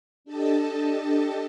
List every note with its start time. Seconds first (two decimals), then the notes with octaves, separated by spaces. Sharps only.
0.24 D4 G4 A4 D#5 A5